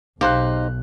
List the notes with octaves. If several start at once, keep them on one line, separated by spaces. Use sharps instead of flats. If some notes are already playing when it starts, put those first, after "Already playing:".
B1 D#4 G4 C5 F5 F#6